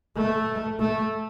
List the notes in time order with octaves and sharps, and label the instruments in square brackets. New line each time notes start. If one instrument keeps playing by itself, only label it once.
[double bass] A3
A3